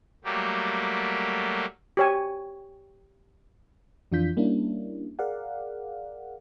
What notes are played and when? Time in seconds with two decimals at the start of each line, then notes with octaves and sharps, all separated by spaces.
0.24 F#3 G3 A3 A#3 G4
1.97 G4 C#5 G#5
4.12 F2 E3 D4 F4 G6 B6
4.37 G3 A#3 C#4 D4 E4
5.19 G#4 A#4 D5 F5 F#5